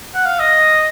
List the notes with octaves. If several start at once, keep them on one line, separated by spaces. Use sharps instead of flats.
F#5
F5
D#5